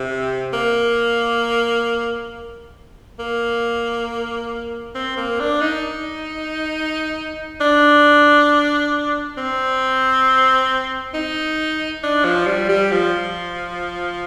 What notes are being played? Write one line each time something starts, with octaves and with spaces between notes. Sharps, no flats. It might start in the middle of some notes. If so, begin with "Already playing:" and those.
Already playing: C3
A#3
A#3
C4
A#3
D4
D#4
D4
C4
D#4
D4
F3
G3
G3
F3